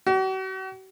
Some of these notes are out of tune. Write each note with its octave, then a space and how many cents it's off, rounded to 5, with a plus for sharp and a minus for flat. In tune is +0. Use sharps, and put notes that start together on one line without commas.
F#4 +45